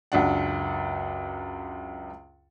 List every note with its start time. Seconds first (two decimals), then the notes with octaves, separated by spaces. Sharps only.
0.12 C#2 F#2 D4 F#5